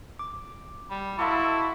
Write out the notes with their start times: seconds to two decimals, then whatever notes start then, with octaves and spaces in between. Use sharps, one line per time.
0.19 D6
0.90 G3
1.19 E4 F#4 A4 D#5 F5 C6 D6